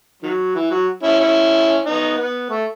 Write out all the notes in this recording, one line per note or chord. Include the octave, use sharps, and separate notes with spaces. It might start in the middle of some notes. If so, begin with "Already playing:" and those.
D#3 F#3
E3
F#3
C#4 E4
C#4 E4
B3 D#4
B3
A3